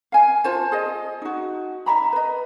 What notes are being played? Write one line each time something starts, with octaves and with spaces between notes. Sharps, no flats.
F5 G#5
F4 C5 A5
G#4 D#5
D#4 F#4
E5 F#5 A#5 B5
B4 D#5